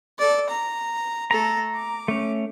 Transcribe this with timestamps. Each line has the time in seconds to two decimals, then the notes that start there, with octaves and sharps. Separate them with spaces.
0.19 A4 D5
0.49 A#5
1.31 A3 A4 A#5
1.75 D6
2.08 A3 C#4